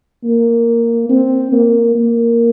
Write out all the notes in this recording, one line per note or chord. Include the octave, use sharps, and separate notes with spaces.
A#3
C4
A#3
A#3